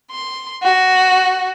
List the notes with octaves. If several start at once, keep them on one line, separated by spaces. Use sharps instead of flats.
C6
F#4